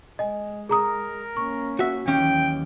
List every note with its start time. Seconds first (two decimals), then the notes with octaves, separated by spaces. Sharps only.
0.19 G#3 D#5 G#5
0.69 G#4 A#4 A#5 D#6
1.37 A#3 C#4 C#6
1.79 F#4 E5
2.08 D#2 E3 F#3 C#4 G5